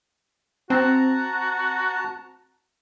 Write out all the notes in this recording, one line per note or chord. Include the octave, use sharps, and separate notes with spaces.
C4 F#4 A5 A#5